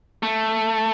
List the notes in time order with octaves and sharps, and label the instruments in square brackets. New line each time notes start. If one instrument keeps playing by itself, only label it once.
[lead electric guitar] A3